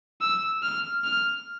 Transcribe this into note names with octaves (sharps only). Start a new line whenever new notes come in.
E6
F6
F6